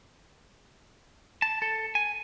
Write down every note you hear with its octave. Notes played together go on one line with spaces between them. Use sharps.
A5
A4
G#5